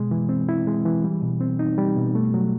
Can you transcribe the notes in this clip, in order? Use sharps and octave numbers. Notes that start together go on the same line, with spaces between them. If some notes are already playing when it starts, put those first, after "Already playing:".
Already playing: B2 G#3
E3
C4
E4
G#3
E3
G3
B2
C4
D#4
G3
B2
A3
F#3